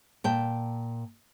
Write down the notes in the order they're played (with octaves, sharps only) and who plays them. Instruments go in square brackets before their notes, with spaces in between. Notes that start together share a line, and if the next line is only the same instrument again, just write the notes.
[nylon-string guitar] A#2 G5 A5